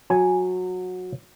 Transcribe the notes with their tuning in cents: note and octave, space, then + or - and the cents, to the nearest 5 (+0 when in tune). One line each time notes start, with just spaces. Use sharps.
F#3 -20 G#5 +0